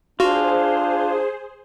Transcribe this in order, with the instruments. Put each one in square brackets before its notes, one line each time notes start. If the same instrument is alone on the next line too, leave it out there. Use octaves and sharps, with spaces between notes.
[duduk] D4 [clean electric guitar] F4 [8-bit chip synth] F#4 [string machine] G#4 C5